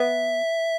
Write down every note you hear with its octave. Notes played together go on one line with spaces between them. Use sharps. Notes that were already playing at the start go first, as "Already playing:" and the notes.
Already playing: B3 E5